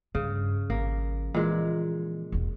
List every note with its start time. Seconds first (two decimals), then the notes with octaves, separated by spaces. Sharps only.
0.15 G2 C#3
0.70 G#1 F3 A#3
1.34 A#2 E3 G#3
2.32 E1 B3